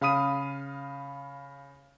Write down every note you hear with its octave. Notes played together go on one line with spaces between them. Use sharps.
C#3 F5 B5 D#6 D#7